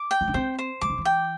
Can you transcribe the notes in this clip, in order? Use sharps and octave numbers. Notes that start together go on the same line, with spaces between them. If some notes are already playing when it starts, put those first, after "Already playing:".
Already playing: D6
G5
E4
D4
C4 C5
C5
E3 D6
D3
E3
G5